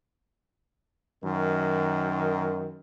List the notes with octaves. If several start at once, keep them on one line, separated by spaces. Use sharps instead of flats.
F#2 D#3